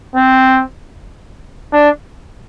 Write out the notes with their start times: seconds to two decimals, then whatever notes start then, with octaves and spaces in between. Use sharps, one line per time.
0.16 C4
1.73 D4